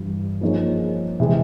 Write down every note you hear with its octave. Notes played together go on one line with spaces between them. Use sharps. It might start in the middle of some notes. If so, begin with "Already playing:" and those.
Already playing: G2 E3 G3
F3 A#3 D#4 G#4 C#5
C3 E3 G#3